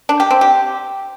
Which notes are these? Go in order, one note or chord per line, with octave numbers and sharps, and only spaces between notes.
D4
G4
C4
G4